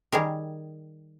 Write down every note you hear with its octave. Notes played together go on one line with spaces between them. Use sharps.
D#3 G3 G#4 A#4